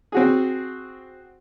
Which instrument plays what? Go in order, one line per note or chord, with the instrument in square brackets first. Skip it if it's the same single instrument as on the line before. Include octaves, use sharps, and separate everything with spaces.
[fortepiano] C4 F#4 G#4